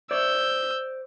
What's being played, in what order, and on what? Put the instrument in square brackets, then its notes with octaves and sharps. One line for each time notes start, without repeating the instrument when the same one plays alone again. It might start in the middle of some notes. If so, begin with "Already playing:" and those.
[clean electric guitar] C5 D5 [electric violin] E6 G6